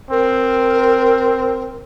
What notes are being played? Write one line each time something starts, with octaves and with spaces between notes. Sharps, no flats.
C4 A#4